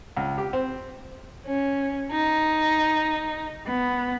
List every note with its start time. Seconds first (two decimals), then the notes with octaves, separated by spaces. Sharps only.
0.17 C#2
0.38 G4
0.53 C4
1.45 C#4
2.12 D#4
3.65 B3